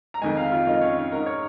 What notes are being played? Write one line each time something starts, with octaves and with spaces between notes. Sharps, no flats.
A#5
F2 D#3 G#3 G#5
F5
F4
F2 D#3 G#3 D#4
C#4
D#4
G#2 G#3 A#4
C#5